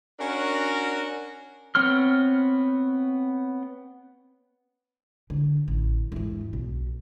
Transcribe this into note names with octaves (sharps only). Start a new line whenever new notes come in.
C#4 D4 F#4 A#4
B3 C4 C#5 C6 F6
D3
A1
E2 G#2
B1